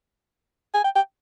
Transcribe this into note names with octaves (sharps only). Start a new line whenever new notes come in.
G#5
G5
G5